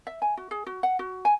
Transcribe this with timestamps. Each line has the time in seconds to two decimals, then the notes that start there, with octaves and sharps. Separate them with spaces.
0.07 E5
0.22 G#5
0.37 F#4
0.51 G#4
0.67 F#4
0.83 F#5
0.99 F#4
1.25 G#5